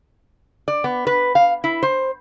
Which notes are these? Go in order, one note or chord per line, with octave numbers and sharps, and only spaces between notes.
D5
B3
B4
F5
E4
C5